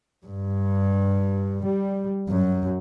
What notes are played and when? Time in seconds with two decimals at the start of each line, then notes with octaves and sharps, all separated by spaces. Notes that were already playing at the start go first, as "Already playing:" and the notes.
0.24 G2
1.66 G3
2.28 F#2